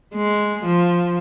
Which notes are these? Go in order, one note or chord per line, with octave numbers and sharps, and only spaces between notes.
G#3
F3